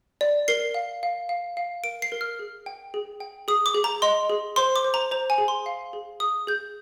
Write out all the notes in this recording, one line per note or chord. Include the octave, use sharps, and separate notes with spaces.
D5
A#4 C7
F5
F5
F5
F5
A#4 D7
C7
A#4
F6
G#4
G5
G#4
G5
G#4 D#6
D6
G#4
A#5
D#5 C6
G#4
C5 C6
D6
C5
A#5
C5 A#5
G#5
G#4
C6
F5
G#4
G#4 D#6
G#4 G6